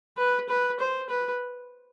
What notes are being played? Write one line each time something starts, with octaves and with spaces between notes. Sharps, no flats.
B4
B4
C5
B4